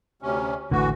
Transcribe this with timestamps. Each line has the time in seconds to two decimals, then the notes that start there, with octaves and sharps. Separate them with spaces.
0.22 D2 C3 C#4
0.71 A1 A2 D3 E3 F#4